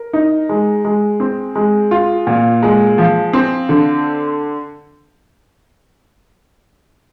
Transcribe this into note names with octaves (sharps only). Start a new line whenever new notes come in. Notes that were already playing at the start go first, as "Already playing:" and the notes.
Already playing: A#4
D#4
G#3
G#3
C4
G#3
F4
A#2
G#3
F3
C4
D3